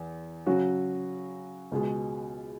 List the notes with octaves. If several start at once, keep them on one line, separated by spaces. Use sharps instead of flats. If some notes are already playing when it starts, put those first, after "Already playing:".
Already playing: E2
C#3 F#3 C#4 F#4
C#2 B2 G#3